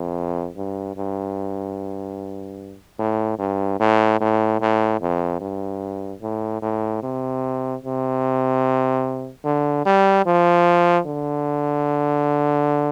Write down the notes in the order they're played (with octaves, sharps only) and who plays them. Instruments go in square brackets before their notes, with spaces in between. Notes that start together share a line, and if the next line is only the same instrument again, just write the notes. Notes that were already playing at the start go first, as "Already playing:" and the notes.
Already playing: [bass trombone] F2
G2
G2
A2
G2
A2
A2
A2
F2
G2
A2
A2
C3
C3
D3
G3
F3
D3